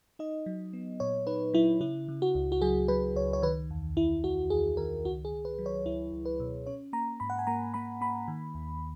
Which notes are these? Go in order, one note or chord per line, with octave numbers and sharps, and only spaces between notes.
D#4 D#5
F#3
B3
A#2 C#5
D#4 B4
F#3 E4
C#3 E4
C#3
F#4
C#2
F#4
F#3 G#4
F#3 B4
C#2 C#5
C#5
D#3 B4
E2
E2 E4
E2 F#4
E2 G#4
D#3 A#4
C#2 F#4
G#4
C#2
B4
F#3
C#5
C#2 E4
C#2
B4
B2
C#4 C#5
A#3 A#5
G#2 B5
F#5
G#5
A#3 A#5
A#3 B5
A#3 B5
D#3
D#2